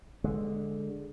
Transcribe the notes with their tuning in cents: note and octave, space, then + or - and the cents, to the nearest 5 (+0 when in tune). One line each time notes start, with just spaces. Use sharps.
D3 -5 G#3 +0